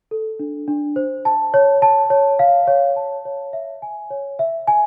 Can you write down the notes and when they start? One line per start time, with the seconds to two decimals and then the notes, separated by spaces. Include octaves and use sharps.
0.11 A4
0.40 D4
0.68 D4
0.96 C5
1.25 A5
1.54 C#5
1.82 A5
2.10 C#5
2.39 F5
2.67 C#5
2.96 A5
3.25 C#5
3.53 E5
3.82 G#5
4.10 C#5
4.39 E5
4.68 G#5